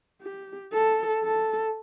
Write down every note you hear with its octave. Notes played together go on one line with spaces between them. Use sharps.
G4
A4
A4